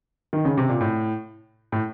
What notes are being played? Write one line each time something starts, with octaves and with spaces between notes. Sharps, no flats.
D#3
C#3
C3
A#2
A2
A2